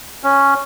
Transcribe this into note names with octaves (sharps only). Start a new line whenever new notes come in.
C#4